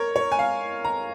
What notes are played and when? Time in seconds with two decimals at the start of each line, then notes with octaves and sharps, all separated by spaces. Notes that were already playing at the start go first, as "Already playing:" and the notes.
Already playing: A#4 C#5
0.16 C#5
0.32 G#5
0.39 F5
0.84 A#5